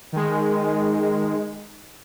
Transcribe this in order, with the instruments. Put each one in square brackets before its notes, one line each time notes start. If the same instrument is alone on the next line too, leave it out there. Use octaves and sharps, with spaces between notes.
[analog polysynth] D#3 G#3